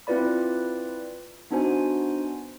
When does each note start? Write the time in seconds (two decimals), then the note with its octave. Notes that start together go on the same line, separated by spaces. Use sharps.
0.07 C4 E4 F4 B4 D5 B5
1.51 B3 D4 D#4 F#4 C5 G#5